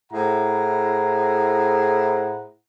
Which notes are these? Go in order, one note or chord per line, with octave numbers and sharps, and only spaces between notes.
A2 E4 G#4 C5 F#5 A#5